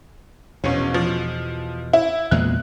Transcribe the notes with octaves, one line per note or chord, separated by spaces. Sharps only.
A#1 E2 B2 C#4
F3
E4
E2 A#2 G#3 F#6